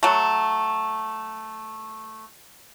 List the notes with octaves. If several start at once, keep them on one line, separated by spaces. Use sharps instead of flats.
F#3 A3